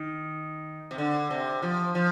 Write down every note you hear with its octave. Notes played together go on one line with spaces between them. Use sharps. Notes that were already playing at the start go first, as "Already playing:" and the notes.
Already playing: D#3
C3
D3
C3
F3
F3